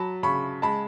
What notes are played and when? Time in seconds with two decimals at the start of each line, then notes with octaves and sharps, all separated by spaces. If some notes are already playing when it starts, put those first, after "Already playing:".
Already playing: F#3 A5 B5
0.23 C#3 B5 C#6
0.62 G#3 A5 B5